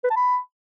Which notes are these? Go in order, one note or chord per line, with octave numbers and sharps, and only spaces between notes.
B4
A5
B5